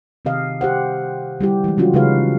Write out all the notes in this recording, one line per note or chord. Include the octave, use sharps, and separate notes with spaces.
C3 D#3 G4 D#5 F5
G4 C5 F#5
D3 G3 E4 G4
E3 G#3
C#3 E3 F#3 C#4 F4 F#4
C#3 G#3 D#4 B4 F5